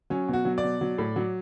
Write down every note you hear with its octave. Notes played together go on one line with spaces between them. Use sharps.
F#3 C#4
B2 F#4
F#3
D5
B2
F#3
A2
F#3